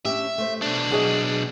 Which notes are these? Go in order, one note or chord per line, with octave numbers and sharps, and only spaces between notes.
C#4 D4 G4 E5
A3 C5
B2 D4
F#3 G#4 D#5